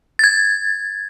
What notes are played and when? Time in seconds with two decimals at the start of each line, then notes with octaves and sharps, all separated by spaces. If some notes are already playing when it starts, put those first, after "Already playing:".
0.19 G#6 A6